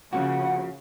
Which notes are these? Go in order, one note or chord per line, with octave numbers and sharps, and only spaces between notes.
C#3 F3 A#3 F#4 F#5